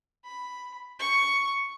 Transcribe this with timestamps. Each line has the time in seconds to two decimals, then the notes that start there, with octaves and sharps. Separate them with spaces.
0.25 B5
0.99 C#6